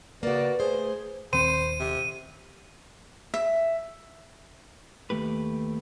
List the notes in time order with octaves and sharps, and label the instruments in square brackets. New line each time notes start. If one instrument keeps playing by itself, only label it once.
[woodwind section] C#3 D5 [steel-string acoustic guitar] A#3 F#4 [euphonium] B4
[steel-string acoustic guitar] A3 C5 [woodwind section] G#4
[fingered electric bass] D#1 D#3 C4 [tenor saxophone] C5 [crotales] D#7
[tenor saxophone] C3
[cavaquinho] E5
[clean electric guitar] D#2 A3 G4 B4